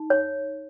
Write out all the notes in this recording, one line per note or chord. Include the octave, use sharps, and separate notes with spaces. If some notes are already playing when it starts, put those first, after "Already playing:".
Already playing: D#4
C#5